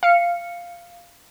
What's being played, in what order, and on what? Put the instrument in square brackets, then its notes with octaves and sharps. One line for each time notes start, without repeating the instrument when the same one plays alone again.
[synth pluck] F5 C#7